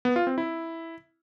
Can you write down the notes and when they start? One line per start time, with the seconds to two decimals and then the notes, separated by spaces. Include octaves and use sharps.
0.05 B3
0.16 F4
0.27 C4
0.38 E4